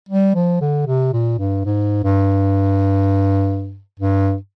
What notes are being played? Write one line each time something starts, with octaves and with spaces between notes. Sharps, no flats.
G3
F3
D3
C3
A#2
G2
G#2
G2
G2